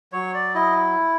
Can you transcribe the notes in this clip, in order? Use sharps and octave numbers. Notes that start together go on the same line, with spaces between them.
F#3 C#5
D5
E4 D#5